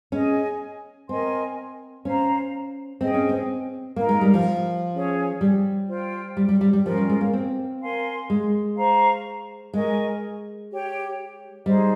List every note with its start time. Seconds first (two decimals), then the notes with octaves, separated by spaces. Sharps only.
0.12 C#4 G#4 D#5 G#5
1.09 C4 A#4 D#5 G#5 C6
2.04 C#4 C5 F5 A#5
3.01 C4 G#4 D#5 G5
3.14 C#4
3.29 C4
3.96 A#3 D#4 A#4 F5
4.09 G#3
4.21 G3
4.34 F3
4.93 C#4 G#4 C#5
5.41 G3
5.89 F4 C5 G5
6.37 G3
6.49 G3
6.61 G3
6.73 G3
6.86 F3 C#4 F4 A#4
6.97 G3
7.10 G#3
7.21 A#3
7.33 C4
7.82 A#4 F5 G#5 C6
8.30 G#3
8.77 C5 F5 A#5 C#6
9.73 G#3 A#4 D#5 G#5 C#6
10.70 G4 C#5 G5
11.65 G3 D#4 G#4 C5 D#5